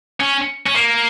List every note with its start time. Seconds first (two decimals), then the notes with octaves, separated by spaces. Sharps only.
0.20 C#4
0.66 C#4
0.75 A#3